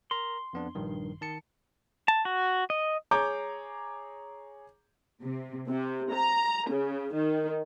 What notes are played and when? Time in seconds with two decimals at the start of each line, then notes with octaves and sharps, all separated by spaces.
0.11 A#4 A#5 C6
0.53 F2 B3 D4
0.75 A#1 G2 D#3
1.21 D#3 A5 C#7
2.08 A5
2.25 F#4
2.70 D#5
3.11 G#4 C#5 A#5 D6 G6 D7
5.22 C3
5.70 C3
6.13 A#5
6.70 C#3
7.15 D#3